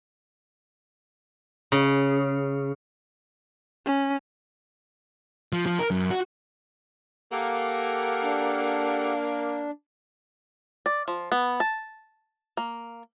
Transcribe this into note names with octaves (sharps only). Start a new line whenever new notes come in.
C#3
C#4
F3
F3
A#4
F#2
F#4
A#3 G4 A4 F#5
D4
D5
F3
B3
A5
A#3